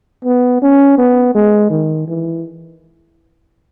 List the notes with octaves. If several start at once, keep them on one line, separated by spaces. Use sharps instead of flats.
B3
C#4
B3
G#3
D#3
E3